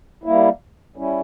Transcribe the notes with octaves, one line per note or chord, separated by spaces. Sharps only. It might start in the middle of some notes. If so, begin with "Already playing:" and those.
G3 A#3 E4
G3 C#4 E4